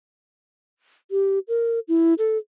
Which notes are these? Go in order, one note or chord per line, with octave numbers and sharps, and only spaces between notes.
G4
A#4
E4
A4